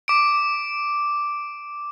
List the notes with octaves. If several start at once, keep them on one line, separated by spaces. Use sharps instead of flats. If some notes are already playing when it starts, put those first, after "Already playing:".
D6 D7